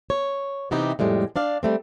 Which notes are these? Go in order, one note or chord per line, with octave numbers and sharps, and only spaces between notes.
C#5
C3 E3 B3 C4 D#4 G4
F2 A2 G3 G#3
D4 D5 F5
G3 A3 C4